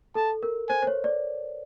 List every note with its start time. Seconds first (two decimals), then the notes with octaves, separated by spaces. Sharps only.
0.15 A4 A5
0.43 A#4
0.69 C5 G#5
0.83 C5
0.87 C#5
1.04 D5